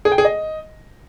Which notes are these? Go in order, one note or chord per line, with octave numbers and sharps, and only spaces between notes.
G#4
G5
G#4
D#5